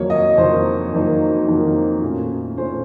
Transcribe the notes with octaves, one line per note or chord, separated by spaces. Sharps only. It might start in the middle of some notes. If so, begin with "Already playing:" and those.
Already playing: F2 D#3 F#3 A#3 D#4 C#5
D#5
F2 D#3 F#3 A#3 D#4 C5
F2 D#3 F#3 A#3 D#4
F2 D#3 F#3 A#3 D#4
A#2 A3 C#4
A#2 A3 C#4 C5